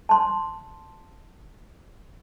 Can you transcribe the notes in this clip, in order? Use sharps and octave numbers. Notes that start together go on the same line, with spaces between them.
A5 C6